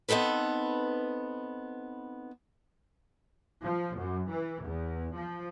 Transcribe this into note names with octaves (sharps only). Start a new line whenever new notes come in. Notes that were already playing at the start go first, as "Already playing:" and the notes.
B3 C4 D#4 A4 B4
F3
F#2
E3
E2
F3